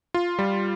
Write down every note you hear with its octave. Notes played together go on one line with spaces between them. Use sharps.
F4
G3